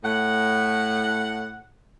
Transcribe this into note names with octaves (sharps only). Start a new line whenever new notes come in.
A2 F#5